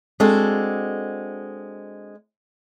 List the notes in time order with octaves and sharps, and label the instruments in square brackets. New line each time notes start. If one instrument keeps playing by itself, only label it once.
[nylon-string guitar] G#3 C4 D4 F#4 A4